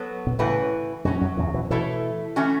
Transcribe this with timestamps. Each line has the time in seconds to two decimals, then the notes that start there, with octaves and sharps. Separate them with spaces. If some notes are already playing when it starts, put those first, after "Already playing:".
Already playing: F#3 B3 F#4 A4
0.27 B2
0.39 A2 C#3 E3 A3 F#4 B4
1.05 F#2 B2 F#3 C#4 F#4
1.21 F#2
1.37 E2 A2
1.47 C#3
1.54 B2 E3
1.70 B2 E3 A3 E4 A4 C#5
2.36 E3 A3 C#4 F#4